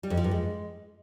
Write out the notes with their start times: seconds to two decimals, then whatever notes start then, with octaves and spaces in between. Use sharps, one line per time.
0.03 G3
0.10 F2
0.17 F3
0.24 G2
0.31 G#3